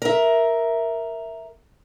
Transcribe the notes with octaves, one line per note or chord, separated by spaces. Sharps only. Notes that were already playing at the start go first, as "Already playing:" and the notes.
A#4 E5